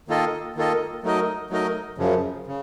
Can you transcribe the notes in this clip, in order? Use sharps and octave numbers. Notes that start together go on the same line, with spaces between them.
D#3 A#3 F4 A4 D#5
D#3 A#3 F4 A4 D#5
F#3 A3 D#4 A#4 D#5
F#3 A3 D#4 A#4 D#5
F#2 C#3 F3
C#3